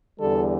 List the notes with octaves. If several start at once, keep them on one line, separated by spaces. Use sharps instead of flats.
E2 D3 G3 A4